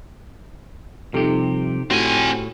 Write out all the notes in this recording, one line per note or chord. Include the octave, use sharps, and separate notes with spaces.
F2 C3 F3 G3 D#4 G4 A4
A2 C4 F#4 G4 G#5